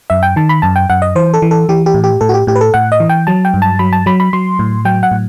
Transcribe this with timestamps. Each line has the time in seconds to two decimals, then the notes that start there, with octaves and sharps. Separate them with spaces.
0.10 F#2 E5
0.23 G5
0.36 D#3 A5
0.49 B5
0.62 F#2 A5
0.76 G5
0.90 F#2 F#5
1.02 D#5
1.16 E3 C5
1.34 A4
1.42 E3
1.51 A4
1.69 E3 G4
1.86 G4
1.94 A2
2.04 G4
2.21 A2 A4
2.29 F#4
2.34 G4
2.47 A2 G4
2.55 B4
2.61 A4
2.74 A2 F#5
2.92 D#5
3.00 E3
3.09 G5
3.27 F#3 A5
3.45 G5
3.54 G2
3.62 A5
3.79 F#3 B5
3.93 A5
4.06 F#3 B5
4.20 B5
4.33 F#3 C6
4.59 A2
4.85 F#3 G5
5.03 F#5
5.11 A2